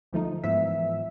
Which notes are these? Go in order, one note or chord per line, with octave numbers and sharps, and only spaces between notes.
D2 F3 A3 D#4
G#2 E3 F3 B3 E5